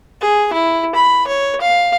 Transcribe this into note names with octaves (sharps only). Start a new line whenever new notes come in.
G#4
E4
B5
C#5
F5